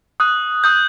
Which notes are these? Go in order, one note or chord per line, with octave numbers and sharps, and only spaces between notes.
D#6 F#6
D#6 G6